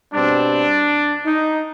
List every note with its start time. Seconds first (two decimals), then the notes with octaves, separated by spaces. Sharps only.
0.13 B2 G3 C4 D4
1.26 D#4